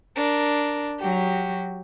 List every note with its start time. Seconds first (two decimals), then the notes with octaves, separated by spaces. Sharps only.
0.16 D4 A#4
0.99 F#3 F#4 G4